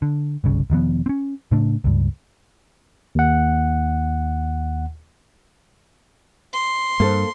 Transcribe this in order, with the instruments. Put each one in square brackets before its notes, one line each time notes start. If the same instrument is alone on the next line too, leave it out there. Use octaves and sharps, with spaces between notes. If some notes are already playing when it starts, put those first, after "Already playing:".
[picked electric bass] D3
G1 C2 C#3
E1 D#3 F3 B3
C4 C#4
A2 C#3 A3 D4
C#2 G2
[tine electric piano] D#2 F#5
[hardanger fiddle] C6
[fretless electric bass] G2 [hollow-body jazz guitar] A#3 A4 C5